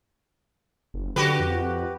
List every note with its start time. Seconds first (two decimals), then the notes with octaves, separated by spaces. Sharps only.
0.94 F#1
1.16 D3 F#4 G4 B4
1.40 F2